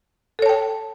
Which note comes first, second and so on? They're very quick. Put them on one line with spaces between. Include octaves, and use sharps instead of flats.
A4 C#5 A5 G5